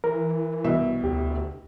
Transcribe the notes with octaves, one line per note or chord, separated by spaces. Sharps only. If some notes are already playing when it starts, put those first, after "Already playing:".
E3 A#4
C2 B2 E5
D2 G4